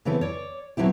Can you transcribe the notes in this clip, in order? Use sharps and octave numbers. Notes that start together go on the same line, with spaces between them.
C#3 E3 B3 C4 E4 A4
C#5 D5
B2 F#3 C4 E4 G4